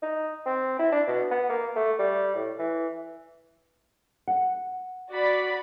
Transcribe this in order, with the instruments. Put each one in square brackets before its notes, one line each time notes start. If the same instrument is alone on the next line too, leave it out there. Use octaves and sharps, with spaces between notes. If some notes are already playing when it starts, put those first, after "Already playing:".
[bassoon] D#4
C4
E4
D4
B2
B3
A#3
A3
G3
A2
E3
[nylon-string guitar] F#5
[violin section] F#4 D5 B5